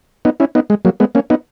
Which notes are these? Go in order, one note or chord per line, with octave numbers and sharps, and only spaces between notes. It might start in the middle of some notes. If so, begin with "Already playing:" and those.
B3 D#4
C#4 E4
B3 D#4
G#3
F#3 A#3
G#3 B3
A#3 C#4
B3 D#4